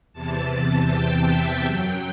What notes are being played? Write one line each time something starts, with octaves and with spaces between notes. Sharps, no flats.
E2 C3 E3 A5
G5
E5
F#2 F#3 G5